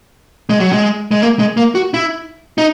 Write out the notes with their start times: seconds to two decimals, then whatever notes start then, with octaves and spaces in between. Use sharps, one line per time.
0.49 G#3
0.60 F#3
0.72 G#3
1.11 G#3
1.21 A#3
1.39 G#3
1.57 A#3
1.75 F#4
1.94 E4
2.58 D#4